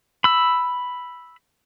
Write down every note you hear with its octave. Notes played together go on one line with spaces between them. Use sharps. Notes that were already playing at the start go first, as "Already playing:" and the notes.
B5 E6